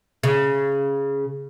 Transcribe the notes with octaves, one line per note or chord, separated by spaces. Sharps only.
C#3